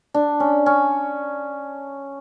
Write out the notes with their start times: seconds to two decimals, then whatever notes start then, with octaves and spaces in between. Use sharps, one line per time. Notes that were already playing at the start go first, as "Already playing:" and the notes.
0.14 D4
0.40 C#4
0.66 C#4